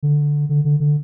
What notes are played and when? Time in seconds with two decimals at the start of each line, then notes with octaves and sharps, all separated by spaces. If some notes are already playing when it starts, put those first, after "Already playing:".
0.03 D3
0.49 D3
0.65 D3
0.80 D3